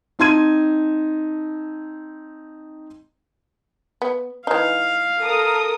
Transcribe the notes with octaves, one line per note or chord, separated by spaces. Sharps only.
C4 D#4 A5 C6 G#6 D#7
B3
E3 D#4 F5
A4 A#4 D#6